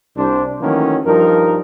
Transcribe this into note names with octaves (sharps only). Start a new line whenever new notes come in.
C2 D4 C5
D#3 E3 F#3 A3 A#3 C#4
G2 F3 D#4 A#4